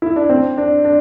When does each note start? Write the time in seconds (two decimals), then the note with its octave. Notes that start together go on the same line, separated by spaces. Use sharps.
0.02 E4
0.16 D4
0.30 C4
0.57 D4
0.84 D4